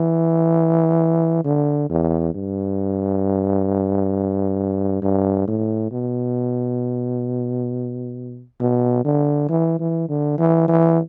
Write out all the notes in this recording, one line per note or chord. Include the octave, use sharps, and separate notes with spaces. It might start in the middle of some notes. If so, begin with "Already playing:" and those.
Already playing: E3
D3
E2
G2
G2
A2
B2
B2
D3
E3
E3
D3
E3
E3